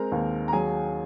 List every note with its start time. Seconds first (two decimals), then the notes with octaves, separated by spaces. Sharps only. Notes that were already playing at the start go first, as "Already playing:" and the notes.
Already playing: G#3 C4 A#4 A#5
0.12 D#2
0.48 A#5
0.53 F#3 G#4 G#5